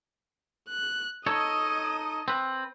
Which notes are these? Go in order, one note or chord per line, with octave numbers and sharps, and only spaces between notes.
F#6
D#4 A4 C#5 D#5 D#6
C4 B4